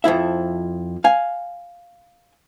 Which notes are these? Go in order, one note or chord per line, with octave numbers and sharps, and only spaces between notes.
F2 F3 E4 E5
F5 G#5